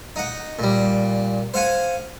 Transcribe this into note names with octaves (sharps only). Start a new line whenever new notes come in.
D#4 F#5
A#2 G3
C5 F5 F#5 G#5